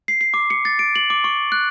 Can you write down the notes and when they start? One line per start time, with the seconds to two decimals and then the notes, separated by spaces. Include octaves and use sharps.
0.08 C7
0.21 C7
0.34 D6
0.50 C#7
0.65 A6
0.79 D7
0.96 F#7
1.10 D6
1.24 C#6
1.52 F#6